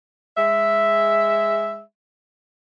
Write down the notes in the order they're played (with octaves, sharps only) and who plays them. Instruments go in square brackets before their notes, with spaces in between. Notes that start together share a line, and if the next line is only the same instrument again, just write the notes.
[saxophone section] G#3 E5